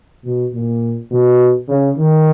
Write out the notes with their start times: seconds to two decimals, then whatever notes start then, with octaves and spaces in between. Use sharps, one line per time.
0.24 B2
0.53 A#2
1.11 B2
1.68 C#3
1.97 D#3